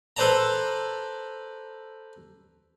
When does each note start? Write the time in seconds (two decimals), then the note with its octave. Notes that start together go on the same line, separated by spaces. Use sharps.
0.17 A4 B4 C5 D5 A5 A#5